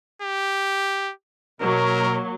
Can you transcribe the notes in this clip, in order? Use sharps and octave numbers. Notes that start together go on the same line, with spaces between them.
G4
B2 F#3 A#3 A#4